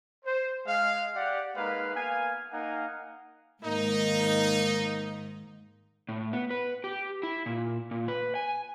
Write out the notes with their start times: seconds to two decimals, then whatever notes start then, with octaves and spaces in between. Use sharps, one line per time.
0.24 C5
0.67 G#3 F5
1.14 G4 D5 F#5
1.56 G#3 A#3 D#4 B4 F5
1.94 A#3 B3 F5 G#5
2.51 A#3 D#4 F5 F#5 G#5
3.64 G#2 D#3 A#3 D#4
6.09 A2
6.33 B3
6.50 B4
6.84 G4
7.23 E4
7.46 A#2
7.91 A#2
8.08 B4
8.35 G#5